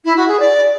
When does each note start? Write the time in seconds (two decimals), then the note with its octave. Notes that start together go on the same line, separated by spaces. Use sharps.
0.04 E4
0.16 F#4
0.28 G#4
0.39 D5